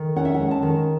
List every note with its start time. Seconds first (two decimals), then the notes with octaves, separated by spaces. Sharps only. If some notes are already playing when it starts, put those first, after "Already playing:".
Already playing: D#3
0.16 C#4 F#5
0.25 E5
0.34 G#3 F#5
0.51 A5
0.63 D#3